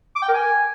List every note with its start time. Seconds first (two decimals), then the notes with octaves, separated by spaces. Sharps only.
0.16 D6
0.22 G5
0.28 A#4
0.34 G#5